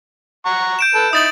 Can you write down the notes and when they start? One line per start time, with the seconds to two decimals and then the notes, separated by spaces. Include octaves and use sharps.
0.46 F#5 A#5 C#6
0.79 G6 D7 E7
0.95 A4 B4
1.13 D#4 E4 D#6 A6 F#7